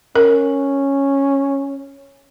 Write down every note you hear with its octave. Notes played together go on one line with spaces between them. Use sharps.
C#4 A#4